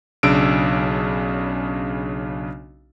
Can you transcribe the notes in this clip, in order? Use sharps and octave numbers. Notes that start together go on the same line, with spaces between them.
B1 C#3 D4 E6 D7